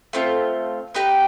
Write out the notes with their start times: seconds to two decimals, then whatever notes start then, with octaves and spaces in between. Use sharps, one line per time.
0.13 A3 C4 F4
0.94 B3 D#4 G4 B4